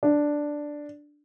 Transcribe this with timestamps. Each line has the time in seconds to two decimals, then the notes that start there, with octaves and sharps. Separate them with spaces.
0.03 D4